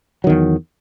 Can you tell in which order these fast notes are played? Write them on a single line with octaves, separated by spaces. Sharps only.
F#3 D#3 E2